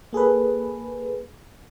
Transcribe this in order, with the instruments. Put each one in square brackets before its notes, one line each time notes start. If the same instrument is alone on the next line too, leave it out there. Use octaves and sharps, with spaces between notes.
[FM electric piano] A#3 G#4 A4 B4